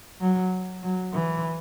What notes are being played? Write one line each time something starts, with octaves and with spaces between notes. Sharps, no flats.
F#3
F#3
E3